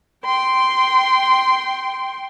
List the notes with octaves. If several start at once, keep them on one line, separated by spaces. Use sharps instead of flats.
G5 C6